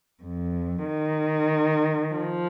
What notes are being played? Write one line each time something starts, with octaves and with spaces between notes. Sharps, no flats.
F2
D#3
F3